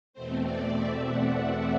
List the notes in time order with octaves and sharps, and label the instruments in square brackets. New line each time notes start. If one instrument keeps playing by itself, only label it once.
[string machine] E2 B2 A3 C4 C5
D5
E5
F#5